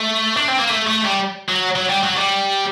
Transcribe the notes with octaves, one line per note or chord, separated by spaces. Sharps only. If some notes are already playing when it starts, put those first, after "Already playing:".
Already playing: A3
D4
C4
A#3
A3
A3
G3
F#3
F#3
G3
F#3
G3